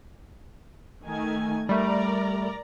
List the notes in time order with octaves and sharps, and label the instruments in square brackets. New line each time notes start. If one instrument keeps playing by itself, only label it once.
[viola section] D#3 A3 G#5
[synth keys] G3 A3 [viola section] A#4 D5 A#5